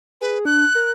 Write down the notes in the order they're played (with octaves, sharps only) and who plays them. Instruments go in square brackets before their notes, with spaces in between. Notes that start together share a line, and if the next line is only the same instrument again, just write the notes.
[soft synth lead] G#4 [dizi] B4
[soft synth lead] D4 [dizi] F#6
[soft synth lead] A#4